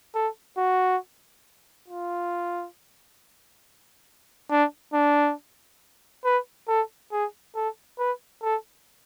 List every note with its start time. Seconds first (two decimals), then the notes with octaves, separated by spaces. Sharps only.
0.15 A4
0.57 F#4
1.88 F4
4.51 D4
4.94 D4
6.24 B4
6.68 A4
7.12 G#4
7.55 A4
7.99 B4
8.42 A4